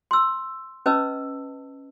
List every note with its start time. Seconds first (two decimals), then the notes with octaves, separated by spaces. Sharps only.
0.11 C6 E6
0.86 C#4 B4 D#5 A5 E6